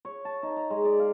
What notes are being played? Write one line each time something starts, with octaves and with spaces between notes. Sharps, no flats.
C#5
A5
D#4
A#5
G#3
D5
F5